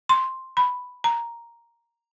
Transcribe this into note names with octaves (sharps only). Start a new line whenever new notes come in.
C6
B5
A#5